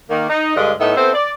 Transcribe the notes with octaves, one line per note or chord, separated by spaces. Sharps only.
D#3 A#3
D#4
G2 D3 G#3 D#5 F5
A2 B3 D#4 E5
B3 C4 E4 A4 C5
D5